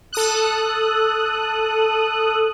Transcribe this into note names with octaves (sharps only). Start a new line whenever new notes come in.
A4 D#6 F#6